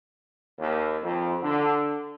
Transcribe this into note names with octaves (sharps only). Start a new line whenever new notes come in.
D#2
F2
D3